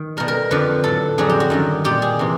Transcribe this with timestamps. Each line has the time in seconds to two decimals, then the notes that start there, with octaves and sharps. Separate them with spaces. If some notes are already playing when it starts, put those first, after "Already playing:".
Already playing: D#3
0.17 B2 G3 A#4
0.28 A#4
0.51 F2 D3 F3 B4
0.84 A2 F#3 A4
1.18 F2 D3 F#3 G#4
1.29 G4
1.40 F#4
1.50 F#2 D#3 G3
1.84 A#2 G3 G4
2.02 G#4
2.19 C3 E3